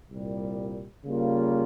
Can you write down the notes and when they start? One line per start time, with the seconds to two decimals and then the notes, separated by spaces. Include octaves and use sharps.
0.10 C2 A#2 G3
1.05 C#3 G3 A#3 F4